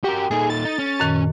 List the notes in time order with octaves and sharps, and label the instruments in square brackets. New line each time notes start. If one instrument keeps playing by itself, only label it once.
[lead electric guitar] F#4 A#4 [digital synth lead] G4
[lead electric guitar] A#2 D#4 [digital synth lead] G#4 [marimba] A4
[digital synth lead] A6
[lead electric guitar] D#4
C#4
[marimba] F#2 A#2 D#3